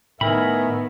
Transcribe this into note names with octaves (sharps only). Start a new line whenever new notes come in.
A2 D#3 B3 A#4 E5 G#5 B5